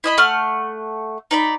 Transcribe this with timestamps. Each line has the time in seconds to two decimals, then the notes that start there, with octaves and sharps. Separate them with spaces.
0.04 E4 D#5 B5
0.18 A3 F#5 F6
1.31 D#4 D5 B5